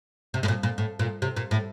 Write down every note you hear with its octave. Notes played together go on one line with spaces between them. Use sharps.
C3
A2
A#2
A#2
A2
A#2
C3
A#2
A2